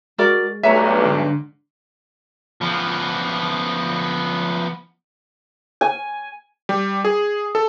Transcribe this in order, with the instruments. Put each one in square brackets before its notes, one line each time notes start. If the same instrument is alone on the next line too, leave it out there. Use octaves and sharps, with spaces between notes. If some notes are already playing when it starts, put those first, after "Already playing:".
[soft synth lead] G#3 [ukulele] F#4 A#4 D5
[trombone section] B1 G2 [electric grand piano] A3 C#5 G#5 [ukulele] E5 A#5 [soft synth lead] F#5
[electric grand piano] G#2 [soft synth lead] D3
[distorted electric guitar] F3 B3
[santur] G#5
[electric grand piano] G3
G#4
A4